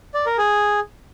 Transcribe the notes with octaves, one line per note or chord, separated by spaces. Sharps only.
D5
A#4
G#4